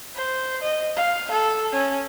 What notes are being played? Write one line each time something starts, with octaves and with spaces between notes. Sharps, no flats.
C5
D#5
F5
A4
C#4